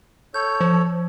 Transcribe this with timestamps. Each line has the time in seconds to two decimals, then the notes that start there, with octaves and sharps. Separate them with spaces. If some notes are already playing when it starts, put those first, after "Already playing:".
0.34 A4 C#5 G6
0.61 F3